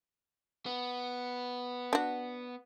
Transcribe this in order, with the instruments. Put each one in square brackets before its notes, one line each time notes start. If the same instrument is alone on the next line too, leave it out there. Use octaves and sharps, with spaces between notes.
[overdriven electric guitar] B3
[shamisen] D4 F#4